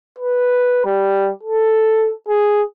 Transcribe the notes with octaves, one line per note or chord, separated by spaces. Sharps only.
B4
G3
A4
G#4